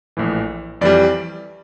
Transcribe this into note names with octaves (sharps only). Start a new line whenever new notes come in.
A#1 A2 E3
F2 E3 G3 D5